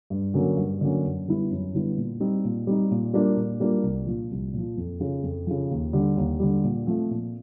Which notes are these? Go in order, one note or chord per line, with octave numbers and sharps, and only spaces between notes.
G2
D3 F#3 A#3 C#4
G2
D3 F#3 A#3 C#4
F#2
D3 G3 B3 E4
F#2
D3 G3 B3 E4
A#2
G3 C4 D#4
A#2
G3 C4 D#4
A#2
G3 A#3 D4 F4
A#2
G3 A#3 D4 F4
C2
A#2 F3
C2
A#2 F3
F2
C#3 F3
F2
C#3 F3
D#2
D3 G3
D#2
D3 G3
A#2
F3 A3 C4
A#2